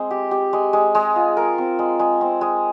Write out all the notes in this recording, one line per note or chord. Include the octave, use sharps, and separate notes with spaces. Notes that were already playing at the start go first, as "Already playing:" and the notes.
Already playing: G#3 C4
G4
G4
G#3
G#3
G#3
F4
A#4
C4
G#3
G#3
C4
G#3